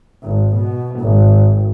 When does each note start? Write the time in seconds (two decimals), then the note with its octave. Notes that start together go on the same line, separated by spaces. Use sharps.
0.23 G#1
0.55 B2
1.00 G#1